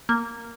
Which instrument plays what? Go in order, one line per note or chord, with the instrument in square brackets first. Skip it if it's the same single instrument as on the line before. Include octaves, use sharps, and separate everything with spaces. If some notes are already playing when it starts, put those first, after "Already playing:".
[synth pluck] A#3